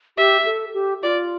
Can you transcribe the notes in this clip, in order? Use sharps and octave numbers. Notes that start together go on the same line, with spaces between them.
G4 E5
A4
G4
F4 D5